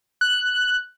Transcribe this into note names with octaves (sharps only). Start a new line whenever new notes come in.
F#6